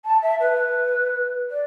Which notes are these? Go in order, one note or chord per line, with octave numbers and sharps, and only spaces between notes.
A5
E5
B4
D5